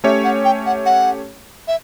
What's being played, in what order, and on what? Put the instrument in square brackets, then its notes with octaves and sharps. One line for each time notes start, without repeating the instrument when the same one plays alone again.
[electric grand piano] A3 C#4 G4 C#5 [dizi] E5
[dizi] F#5
G5
F#5
F#5
E5